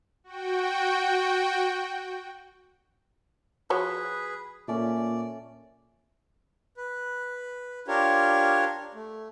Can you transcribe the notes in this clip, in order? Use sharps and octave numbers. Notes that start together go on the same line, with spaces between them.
F#4 G5
F3 F#4 G#4 B4 C#5
A#2 A3 C#4 D5
B4
D4 F4 G4 A#4 C#5
A3